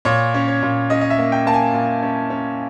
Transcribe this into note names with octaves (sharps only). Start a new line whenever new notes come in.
A#2 C#5
C#4
C#5
A#2
C#4 D#5
D#5
E5
A#3
G5
A#3 A5
G#5
A#2
C#4
C#4